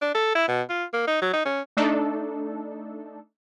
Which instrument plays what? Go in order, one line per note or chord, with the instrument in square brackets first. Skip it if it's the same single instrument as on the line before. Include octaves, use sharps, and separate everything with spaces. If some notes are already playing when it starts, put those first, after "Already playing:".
[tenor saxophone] D4
A4
E4
B2
F4
A#3
D#4
F#3
D#4
C#4
[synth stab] A3 D4 D#4 A4